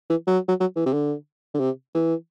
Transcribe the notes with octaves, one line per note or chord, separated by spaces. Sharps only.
E3
F#3
F#3
F#3
E3
C3
D3
D3
C3
E3